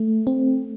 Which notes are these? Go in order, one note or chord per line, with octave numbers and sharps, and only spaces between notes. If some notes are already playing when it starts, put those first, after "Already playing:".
Already playing: A3
C4